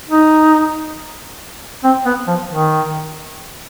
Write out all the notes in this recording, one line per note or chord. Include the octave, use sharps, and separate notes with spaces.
D#4
C4
B3
F3
D#3